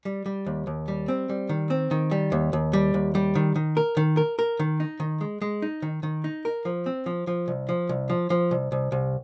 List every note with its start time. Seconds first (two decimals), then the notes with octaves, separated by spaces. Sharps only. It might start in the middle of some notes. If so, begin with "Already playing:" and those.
0.05 G3
0.26 G3
0.46 D#2
0.67 D#2
0.88 G3
1.08 C4
1.29 G3
1.49 D#3
1.70 C4
1.91 D#3
2.11 G3
2.32 D#2
2.53 D#2
2.73 G3
2.94 D#2
3.15 G3
3.35 D#3
3.56 D#3
3.77 A#4
3.97 D#3
4.17 A#4
4.39 A#4
4.60 D#3
4.80 D#4
5.00 D#3
5.21 G#3
5.42 G#3
5.62 D#4
5.82 D#3
6.03 D#3
6.24 D#4
6.45 A#4
6.65 F3
6.86 C4
7.06 F3
7.27 F3
7.48 C2
7.69 F3
7.89 C2
8.10 F3
8.30 F3
8.51 C2
8.72 C2
8.92 C2